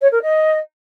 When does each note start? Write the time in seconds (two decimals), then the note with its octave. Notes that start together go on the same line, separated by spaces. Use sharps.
0.01 C#5
0.11 A#4
0.22 D#5